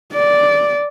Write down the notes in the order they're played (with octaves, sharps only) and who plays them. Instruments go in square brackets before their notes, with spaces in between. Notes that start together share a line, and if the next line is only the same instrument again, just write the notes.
[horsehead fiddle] D5